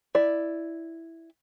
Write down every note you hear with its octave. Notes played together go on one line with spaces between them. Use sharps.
E4 D5